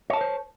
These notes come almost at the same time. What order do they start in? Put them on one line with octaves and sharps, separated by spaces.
C#5 A5 A#4 C5